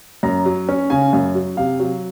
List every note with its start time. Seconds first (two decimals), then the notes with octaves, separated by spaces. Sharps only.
0.23 F#2 A#5
0.46 F#3
0.69 C#4
0.90 C#3 G#5
1.13 F#2
1.35 F#3
1.57 C3 F5
1.80 F#3